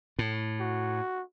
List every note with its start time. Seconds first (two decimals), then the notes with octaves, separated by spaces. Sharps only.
0.19 A2
0.60 F#4